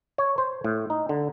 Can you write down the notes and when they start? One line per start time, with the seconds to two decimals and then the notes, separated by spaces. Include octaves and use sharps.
0.18 C#5
0.38 C5
0.64 A2
0.90 D#4
1.09 D3